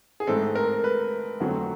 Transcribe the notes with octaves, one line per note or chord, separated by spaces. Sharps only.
G#4
G#2 E3 A3 C4 A4
A#4
B4
F2 D3 F#3 A3 C4